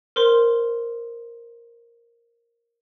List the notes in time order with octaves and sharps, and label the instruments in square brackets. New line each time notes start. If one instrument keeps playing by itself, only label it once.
[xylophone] A#4 C5 C6